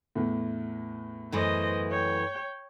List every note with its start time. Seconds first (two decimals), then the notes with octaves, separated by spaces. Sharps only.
0.16 E2 A2
1.32 F#2 E3 A3 C5 D#5
1.91 C#5 G5